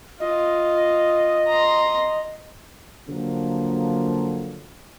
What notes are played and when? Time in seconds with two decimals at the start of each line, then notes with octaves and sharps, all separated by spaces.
0.20 F4 D#5
1.47 A#5 C6
3.08 D3 F3 F#3 A#3